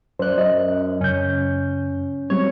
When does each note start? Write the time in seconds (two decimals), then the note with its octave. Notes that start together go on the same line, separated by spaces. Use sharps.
0.19 F#2 C5 D5 F#6
0.38 F#2 D#5
1.01 F#2 C#3 C#4 G6
2.30 F#3 G3 C4 C#5